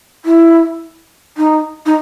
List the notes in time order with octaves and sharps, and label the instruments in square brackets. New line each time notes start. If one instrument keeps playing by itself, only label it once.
[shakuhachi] E4
D#4
D#4